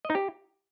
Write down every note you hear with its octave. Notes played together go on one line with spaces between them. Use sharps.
D#5
D#4
G4